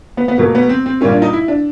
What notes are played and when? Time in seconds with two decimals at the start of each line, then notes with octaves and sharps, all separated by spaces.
0.17 B3
0.28 B3
0.38 B2 F#3 A3 A#3
0.55 B3
0.69 C4
0.86 C4
1.01 A#2 G3 A#3 C#4
1.12 D4
1.22 D#4
1.33 E4
1.48 D4